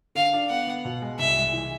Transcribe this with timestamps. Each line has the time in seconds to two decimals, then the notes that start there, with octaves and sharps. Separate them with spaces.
0.15 D3 F5
0.33 D4
0.50 B3 F#5
0.67 B3
0.85 B2
1.02 G#3
1.19 C2 E5
1.36 G#3
1.53 E3